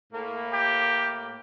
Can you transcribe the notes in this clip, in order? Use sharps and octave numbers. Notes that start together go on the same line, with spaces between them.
A2 A#3
G4